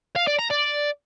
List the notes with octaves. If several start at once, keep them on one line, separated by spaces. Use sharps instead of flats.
F5
D5
A#5
D5